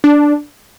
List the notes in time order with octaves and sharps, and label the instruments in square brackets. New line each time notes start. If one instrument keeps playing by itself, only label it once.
[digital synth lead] D4